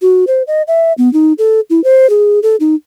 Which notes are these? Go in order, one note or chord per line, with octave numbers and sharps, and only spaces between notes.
F#4
C5
D#5
E5
B3
D#4
A4
E4
C5
G#4
A4
D#4